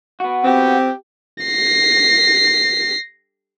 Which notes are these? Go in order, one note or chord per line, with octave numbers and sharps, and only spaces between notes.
B3 F#4
C4 G4
A#6 C7